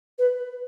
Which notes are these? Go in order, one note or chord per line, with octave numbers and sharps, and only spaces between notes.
B4